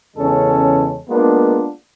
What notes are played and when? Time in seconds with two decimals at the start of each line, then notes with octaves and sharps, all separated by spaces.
0.16 E2 C#3 G#3 C#4 A4
1.08 G#3 A#3 B3 D4 F4